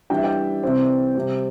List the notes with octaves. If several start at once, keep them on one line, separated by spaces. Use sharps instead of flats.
E3 G3 D4 G5
E5
D5 G5
C3 E3 C4
C3 G3 C4